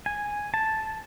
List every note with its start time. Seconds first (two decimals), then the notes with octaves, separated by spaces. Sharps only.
0.06 G#5
0.54 A5